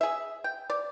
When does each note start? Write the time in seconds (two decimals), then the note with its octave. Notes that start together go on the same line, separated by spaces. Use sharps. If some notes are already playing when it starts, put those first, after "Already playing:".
0.01 G#4 E5
0.44 G5
0.70 D5